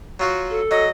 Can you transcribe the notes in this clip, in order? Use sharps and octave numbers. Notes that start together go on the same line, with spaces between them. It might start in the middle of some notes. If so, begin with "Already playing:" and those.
F#3 F4 F#4
A4
F#3 D#5